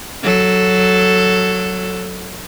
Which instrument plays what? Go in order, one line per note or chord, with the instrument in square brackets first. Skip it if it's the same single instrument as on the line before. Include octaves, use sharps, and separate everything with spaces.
[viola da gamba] F#3 A4